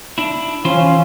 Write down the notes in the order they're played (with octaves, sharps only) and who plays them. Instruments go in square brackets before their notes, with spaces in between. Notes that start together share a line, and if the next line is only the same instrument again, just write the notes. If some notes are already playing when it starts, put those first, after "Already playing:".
[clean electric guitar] D4 E4
[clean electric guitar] E3 F4 C5 [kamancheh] C#4 F5